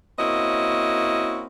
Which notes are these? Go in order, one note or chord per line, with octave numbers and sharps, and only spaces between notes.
A#3 C4 C#4 E4 F#4 D#5